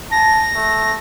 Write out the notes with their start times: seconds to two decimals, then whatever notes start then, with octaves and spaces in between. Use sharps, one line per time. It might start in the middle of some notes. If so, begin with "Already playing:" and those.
0.12 A5 A#6
0.55 A3